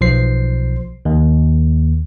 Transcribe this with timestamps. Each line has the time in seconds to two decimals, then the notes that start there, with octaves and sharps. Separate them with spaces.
0.01 B1 F3 C5 C7
1.05 D#2